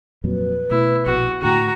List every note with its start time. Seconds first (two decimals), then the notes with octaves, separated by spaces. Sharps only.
0.24 F2 A#2 F#3 B4
0.71 B2 A3 E4
1.06 A#1 B2 F#4
1.42 A2 D3 F#4 G5 A#5